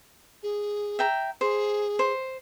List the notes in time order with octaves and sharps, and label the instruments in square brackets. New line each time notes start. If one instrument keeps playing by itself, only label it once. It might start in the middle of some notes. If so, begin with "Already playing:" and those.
[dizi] G#4
[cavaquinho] E5 G5 A#5
[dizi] G#4 [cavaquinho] C5
[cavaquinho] C5